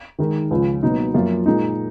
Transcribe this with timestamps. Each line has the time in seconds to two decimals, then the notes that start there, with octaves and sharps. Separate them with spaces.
0.19 D#3 G#3 D#4 A#4
0.51 C#2 C#3 F3
0.83 B2 F#3 A#3 D#4
1.14 F#2 F3 A#3 F4
1.46 A#2 G#3 D#4